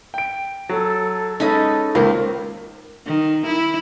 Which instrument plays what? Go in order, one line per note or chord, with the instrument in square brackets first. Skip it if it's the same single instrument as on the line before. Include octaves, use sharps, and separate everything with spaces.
[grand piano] G5 D7
[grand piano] F#3 [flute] A4
[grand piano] G#3 C#4 D#5 [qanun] D#4 B4 [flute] A4
[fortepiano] C#2 A#3 [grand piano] D#3 [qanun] C5
[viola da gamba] D#3
E4